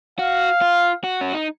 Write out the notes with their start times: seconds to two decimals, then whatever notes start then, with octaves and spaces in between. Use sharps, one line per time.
0.19 F#4 F5
0.62 F4
1.04 F#4
1.21 C#4
1.34 D#4